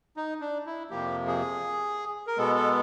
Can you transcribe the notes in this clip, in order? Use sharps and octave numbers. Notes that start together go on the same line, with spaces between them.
D#4
D4
E4
F2 C3 F3 A#3 G4
G#4
A#4
B2 G#3 B3 A4
A4